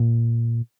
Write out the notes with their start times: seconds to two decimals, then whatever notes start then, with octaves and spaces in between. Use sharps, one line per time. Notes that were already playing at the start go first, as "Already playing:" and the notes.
Already playing: A#2